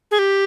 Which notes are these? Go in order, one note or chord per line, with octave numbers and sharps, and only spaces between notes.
G#4
G4